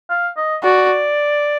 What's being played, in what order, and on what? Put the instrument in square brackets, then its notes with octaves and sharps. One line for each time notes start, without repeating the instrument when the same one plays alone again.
[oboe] F5
D#5
[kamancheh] F#4 [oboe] D5